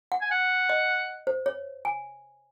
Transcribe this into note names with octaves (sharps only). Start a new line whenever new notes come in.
F#5
G#5
F#5
D#5
C5
C#5
G#5